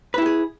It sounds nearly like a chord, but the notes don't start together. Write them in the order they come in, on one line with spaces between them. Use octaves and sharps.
B4 E4 G4 G#4